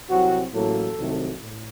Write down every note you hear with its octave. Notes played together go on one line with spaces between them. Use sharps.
C2 C3 F#3 C4 F#4
A1 A2 F#3 A#3 A4
C2 C3 D#3 F#3 A3
A2